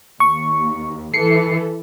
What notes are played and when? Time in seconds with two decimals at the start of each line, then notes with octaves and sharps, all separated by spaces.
0.20 D#2 C#6
1.14 E3 A4 C7 C#7